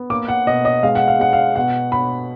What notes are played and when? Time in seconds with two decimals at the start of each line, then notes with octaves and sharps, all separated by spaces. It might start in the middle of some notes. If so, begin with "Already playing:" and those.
Already playing: B3
0.10 A#3 D6
0.28 F#5
0.47 B2 D#5
0.65 D#5
0.83 G#3 F5
0.95 F#5
1.08 F5
1.19 G#3 F#5
1.33 F5
1.56 B2 F#5
1.92 B2 B5